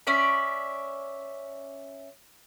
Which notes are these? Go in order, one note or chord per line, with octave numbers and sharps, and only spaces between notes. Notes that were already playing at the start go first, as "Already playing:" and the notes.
C#4 D5 E5